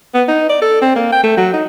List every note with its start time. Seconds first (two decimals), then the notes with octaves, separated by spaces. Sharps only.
0.14 B3
0.28 D#4
0.49 D5
0.62 A4
0.82 C4
0.96 A#3
1.12 G5
1.23 A3
1.37 F#3
1.53 D#4